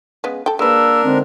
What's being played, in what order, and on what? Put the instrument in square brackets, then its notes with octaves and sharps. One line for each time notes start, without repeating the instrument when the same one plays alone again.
[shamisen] C#3 G#3 B3
A4 G5
[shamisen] G#3 B4 [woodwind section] A#3 E6 [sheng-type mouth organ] D4 A#4
[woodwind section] D3 G#3 D#4 [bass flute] C4